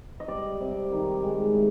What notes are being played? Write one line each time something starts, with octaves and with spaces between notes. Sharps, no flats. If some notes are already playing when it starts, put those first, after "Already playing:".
D#5
G3 D5
C3
D#3
G#3
A2